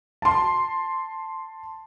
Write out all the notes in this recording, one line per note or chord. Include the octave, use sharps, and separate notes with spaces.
A5 C6